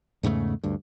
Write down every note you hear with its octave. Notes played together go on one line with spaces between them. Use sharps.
E2 G#2 C#3 A3
D2 G2